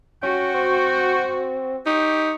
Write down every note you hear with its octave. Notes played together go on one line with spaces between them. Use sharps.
C#4 F#4 G5
C4
D#4 G4 C#6